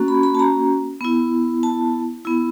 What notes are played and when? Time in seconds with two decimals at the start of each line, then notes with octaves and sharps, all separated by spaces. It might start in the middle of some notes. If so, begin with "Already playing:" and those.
Already playing: A#3 C#4 F#4
0.08 B5
0.23 B5
0.35 A5
0.39 A#5
1.01 B3 E4
1.63 A5
2.25 B3 E4